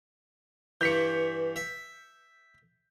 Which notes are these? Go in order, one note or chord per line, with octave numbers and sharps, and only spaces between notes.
G2 E3 G6 B6 C#7
E5